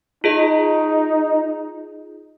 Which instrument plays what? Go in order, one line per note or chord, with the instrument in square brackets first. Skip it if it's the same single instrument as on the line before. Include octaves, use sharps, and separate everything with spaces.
[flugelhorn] D#4 [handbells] F4 G#4 D#5